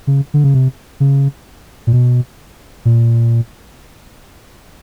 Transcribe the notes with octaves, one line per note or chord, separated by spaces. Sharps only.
C#3
D3
C#3
C3
C#3
A#2
B2
A#2